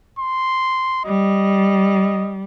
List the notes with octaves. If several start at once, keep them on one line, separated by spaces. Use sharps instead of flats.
C6
G3 D#5